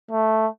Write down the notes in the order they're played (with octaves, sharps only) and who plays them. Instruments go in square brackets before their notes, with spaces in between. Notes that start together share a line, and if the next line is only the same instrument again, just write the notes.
[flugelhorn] A3